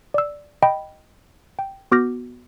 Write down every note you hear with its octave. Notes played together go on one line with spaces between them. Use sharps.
D5 E6
D#5 G5 B5
G5
B3 F#4 D6 F6 G6 A#6